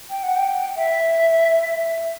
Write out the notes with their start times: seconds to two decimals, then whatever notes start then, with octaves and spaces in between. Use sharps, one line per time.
0.10 G5
0.23 F#5
0.36 G5
0.77 E5